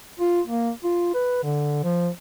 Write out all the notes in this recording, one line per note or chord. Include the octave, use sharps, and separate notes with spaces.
F4
A#3
F4
B4
D3
F3